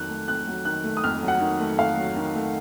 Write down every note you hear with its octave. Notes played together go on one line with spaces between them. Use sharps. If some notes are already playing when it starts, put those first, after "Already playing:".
Already playing: F2 D#3 F#3 F#6
A3
F2 F#6
F#3
D#3 F#6
A3
D#6
F2 F6
F#3
F#5
D#3
A3
F2 F5
F#3
D#3
A3